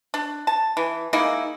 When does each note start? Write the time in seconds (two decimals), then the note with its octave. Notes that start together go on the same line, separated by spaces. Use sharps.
0.14 D4
0.47 A5
0.77 E3
1.13 G#3 A#3 D#4 E4